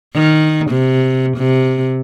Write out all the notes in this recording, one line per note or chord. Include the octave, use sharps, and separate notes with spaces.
D#3
C3
C3